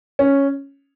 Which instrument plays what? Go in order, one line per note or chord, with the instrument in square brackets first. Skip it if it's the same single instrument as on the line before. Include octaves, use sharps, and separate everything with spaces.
[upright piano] C#4